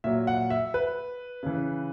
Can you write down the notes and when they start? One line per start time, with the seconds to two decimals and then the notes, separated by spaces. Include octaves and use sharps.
0.04 A#2 F#3 E5
0.27 F#5
0.50 E5
0.74 B4
1.43 C#3 E3